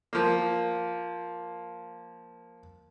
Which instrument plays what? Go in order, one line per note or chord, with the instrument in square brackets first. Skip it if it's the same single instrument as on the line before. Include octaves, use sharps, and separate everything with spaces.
[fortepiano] F3 A#3